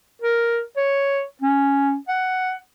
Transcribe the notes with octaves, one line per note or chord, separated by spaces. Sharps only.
A#4
C#5
C#4
F#5